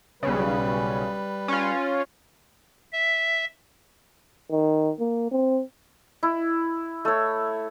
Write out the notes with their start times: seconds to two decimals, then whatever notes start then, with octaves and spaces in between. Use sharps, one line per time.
0.23 B1 C#3 G3 B4
1.48 C#4 F4
2.93 E5
4.51 D#3
5.00 A#3
5.31 C4
6.23 E4
7.05 A3 C#5